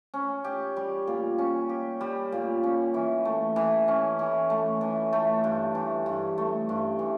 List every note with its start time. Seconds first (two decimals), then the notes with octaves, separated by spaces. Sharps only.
0.14 C#4
0.44 G4
0.76 G3
1.07 A#2
1.38 C#4
1.69 G4
2.01 G3
2.32 A#2
2.63 C#4
2.94 E3
3.25 A3
3.56 E3
3.88 C#4
4.19 E3
4.50 A3
4.81 E3
5.13 A3
5.44 G2
5.75 E3
6.06 G2
6.38 A3
6.69 G2
6.99 E3